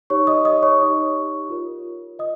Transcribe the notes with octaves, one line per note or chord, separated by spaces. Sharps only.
D#4 G4 C#5 C#6
D#5 D#6
D#5 D#6
C#5 C#6
D#4 G4 C#5
F4 A#4 C#5
F4 D#5 D#6